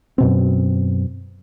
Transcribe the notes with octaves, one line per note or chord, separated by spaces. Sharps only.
F#2 B2 C4